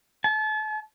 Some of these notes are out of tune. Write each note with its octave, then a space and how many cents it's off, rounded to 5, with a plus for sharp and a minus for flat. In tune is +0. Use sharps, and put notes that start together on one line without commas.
A5 -35